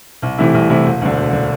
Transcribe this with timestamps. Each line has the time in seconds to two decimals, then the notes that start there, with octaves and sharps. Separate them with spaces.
0.22 C2
0.38 C3 E3 A3 E4
0.54 C2
0.70 C3 E3 A3 E4
0.85 E1
1.01 D2 D3
1.17 E1
1.33 D3